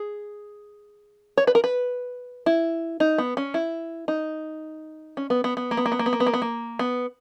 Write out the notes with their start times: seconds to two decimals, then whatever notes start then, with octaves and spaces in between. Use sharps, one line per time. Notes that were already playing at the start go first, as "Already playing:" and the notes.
Already playing: G#4
1.38 C#5
1.47 B4
1.55 A#4
1.64 B4
2.46 E4
3.00 D#4
3.18 B3
3.37 C#4
3.54 E4
4.08 D#4
5.17 C#4
5.30 B3
5.44 B3
5.57 B3
5.71 A#3
5.77 B3
5.86 A#3
5.92 B3
5.99 A#3
6.06 B3
6.13 A#3
6.20 B3
6.26 A#3
6.34 B3
6.42 A#3
6.79 B3